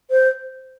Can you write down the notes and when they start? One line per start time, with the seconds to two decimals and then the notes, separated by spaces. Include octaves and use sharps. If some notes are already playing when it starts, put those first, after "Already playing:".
0.11 C5